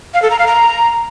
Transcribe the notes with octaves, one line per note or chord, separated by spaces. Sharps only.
F5
A4
A#5
F5
A#5